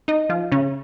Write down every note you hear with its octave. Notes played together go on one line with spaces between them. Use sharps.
D#4 D#5
F3 F4
C#3 C#4